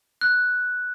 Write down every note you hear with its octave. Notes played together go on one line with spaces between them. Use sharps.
F#6